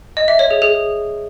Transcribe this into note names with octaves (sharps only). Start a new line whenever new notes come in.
D#5
E5
C#5
G#4
G#4